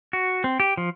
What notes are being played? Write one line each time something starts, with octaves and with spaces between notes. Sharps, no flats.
F#4
C4
G4
F3